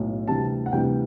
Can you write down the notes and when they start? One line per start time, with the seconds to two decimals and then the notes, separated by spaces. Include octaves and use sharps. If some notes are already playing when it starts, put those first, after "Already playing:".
Already playing: B1 A2
0.28 D2 C3 E3 G3 A5
0.66 F#5
0.72 D2 C3 E3 G3 G5